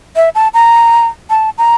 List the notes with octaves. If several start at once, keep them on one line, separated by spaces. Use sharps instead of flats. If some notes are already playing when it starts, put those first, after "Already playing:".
E5
A5
A#5
A5
A#5